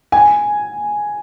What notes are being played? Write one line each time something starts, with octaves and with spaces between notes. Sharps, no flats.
G#5